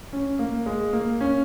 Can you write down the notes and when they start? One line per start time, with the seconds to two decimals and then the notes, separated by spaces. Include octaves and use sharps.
0.13 C#4
0.39 A#3
0.66 G#3
0.93 A#3
1.21 C#4